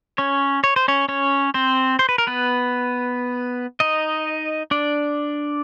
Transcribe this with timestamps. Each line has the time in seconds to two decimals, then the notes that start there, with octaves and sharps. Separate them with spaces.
0.18 C#4 C#5
0.64 C#5
0.76 C5
0.88 C#4 C#5
1.09 C#4 C#5
1.54 C4 C5
1.99 C5
2.09 B4
2.18 A#4
2.27 B3 B4
3.80 D#4 D#5
4.71 D4 D5